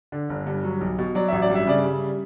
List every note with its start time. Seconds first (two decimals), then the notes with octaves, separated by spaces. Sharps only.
0.12 D3
0.30 G1
0.47 G2
0.64 F#3
0.81 B1
0.99 B2
1.15 F#3 D5
1.28 A1 E5
1.42 D5
1.50 G2
1.55 E5
1.67 C#3 D5
1.84 G3